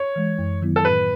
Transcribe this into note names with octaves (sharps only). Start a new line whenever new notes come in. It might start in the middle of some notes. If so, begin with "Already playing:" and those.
Already playing: C#5
E3 G#3
F#2
D#3 F#3 B3 E4
A4
A2 B4